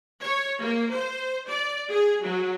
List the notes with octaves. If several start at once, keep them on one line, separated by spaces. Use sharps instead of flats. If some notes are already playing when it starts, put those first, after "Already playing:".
C#5
A#3
C5
D5
G#4
F#3